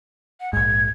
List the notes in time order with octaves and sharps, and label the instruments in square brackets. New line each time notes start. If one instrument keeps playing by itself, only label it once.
[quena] F#5
[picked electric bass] A#1 G#2 [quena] G#6